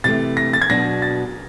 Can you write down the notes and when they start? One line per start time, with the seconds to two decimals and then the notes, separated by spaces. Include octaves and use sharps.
0.04 C3 E3 A3 A6
0.37 A#6
0.53 A6
0.62 G#6
0.69 B2 F#3 B3 D4 F#4 A#6
1.02 A6